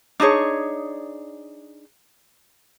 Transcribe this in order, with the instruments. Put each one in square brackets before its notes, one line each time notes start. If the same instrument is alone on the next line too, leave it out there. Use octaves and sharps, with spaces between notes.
[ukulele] D4 D#4 G#4 C#5